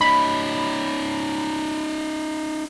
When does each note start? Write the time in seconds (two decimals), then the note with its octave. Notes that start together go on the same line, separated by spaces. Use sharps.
0.01 C#4 D#4 B5